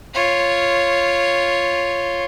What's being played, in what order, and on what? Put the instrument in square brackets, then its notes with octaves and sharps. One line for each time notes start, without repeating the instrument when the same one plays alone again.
[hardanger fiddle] F4 C#5